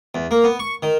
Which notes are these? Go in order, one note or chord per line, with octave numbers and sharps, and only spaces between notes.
E2
A#3
B3
C#6
D#3